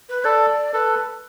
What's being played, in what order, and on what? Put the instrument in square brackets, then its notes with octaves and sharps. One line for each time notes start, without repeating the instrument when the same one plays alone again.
[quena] B4
[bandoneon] A4 [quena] D5
[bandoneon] A4 [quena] B4